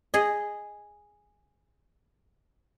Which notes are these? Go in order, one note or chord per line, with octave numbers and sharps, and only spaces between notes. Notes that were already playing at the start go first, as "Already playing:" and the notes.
G#4 D#5